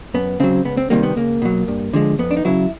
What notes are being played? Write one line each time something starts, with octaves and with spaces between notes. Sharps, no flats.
F#2 B3
C#3 F#3 C4
C#2 B3
C4
C3 D#3 G3 A#3
B3
C#2 A#3
B2 F#3
G2
D3 F3 G#3
F2 B3
D4
D#4
C#3 F#3 E4